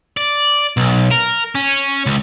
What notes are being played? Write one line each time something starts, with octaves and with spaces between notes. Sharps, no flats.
D5
B1
A#4
C#4
C#2